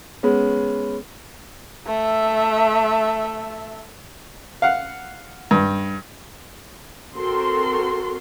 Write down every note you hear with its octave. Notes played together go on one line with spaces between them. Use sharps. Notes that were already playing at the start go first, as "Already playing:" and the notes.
G#3 B3 C#4
A3 E5
F5 F#5
G2
C4 F#4 A4 A#4 C6